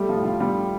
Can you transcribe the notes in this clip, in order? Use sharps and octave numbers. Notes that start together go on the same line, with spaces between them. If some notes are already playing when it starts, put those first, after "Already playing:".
Already playing: G3 A3 G4
F3 F4
A2
F3 F4
F3 G3 G4